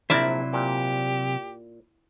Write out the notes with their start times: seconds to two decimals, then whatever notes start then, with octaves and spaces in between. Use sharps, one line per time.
0.10 A#1 C3 F#3 E4 A#4 C5 D5 E5
0.54 A#2 G4